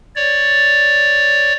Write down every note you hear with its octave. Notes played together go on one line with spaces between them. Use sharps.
C#5 D5